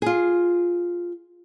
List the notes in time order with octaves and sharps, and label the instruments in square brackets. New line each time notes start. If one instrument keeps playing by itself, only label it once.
[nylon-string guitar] F4 G#4